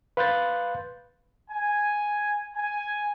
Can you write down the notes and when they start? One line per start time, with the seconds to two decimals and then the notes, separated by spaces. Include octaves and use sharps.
0.17 B4 F5 C6 F#6 G6 A6
1.51 G#5
2.56 G#5